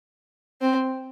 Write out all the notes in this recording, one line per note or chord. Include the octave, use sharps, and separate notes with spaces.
C4